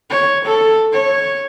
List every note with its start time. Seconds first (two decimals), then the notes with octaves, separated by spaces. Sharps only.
0.10 C#5
0.45 A4
0.93 C#5